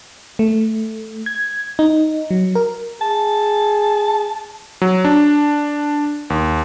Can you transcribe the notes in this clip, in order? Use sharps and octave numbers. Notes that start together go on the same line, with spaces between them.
A3
G#6
D#4
F#3
A#4
G#4 A5
F#3
D4
D#2